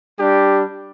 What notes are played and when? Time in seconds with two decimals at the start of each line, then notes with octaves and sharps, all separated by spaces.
0.19 G3 D4 G4